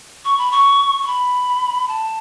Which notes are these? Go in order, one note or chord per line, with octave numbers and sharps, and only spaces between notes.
C#6
B5
C#6
C#6
B5
A5